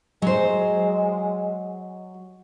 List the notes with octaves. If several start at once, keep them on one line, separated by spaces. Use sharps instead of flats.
F#3 G#3 C5